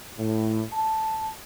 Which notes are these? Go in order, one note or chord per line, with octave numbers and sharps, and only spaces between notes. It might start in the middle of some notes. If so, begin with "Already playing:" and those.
A2
A5